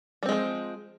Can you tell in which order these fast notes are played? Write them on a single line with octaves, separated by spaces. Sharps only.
G3 C4 G#3 F3